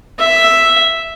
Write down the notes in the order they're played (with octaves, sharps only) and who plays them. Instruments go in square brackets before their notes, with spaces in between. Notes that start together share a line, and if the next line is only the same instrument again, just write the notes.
[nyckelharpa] E5